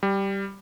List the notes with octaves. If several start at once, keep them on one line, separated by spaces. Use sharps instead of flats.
G3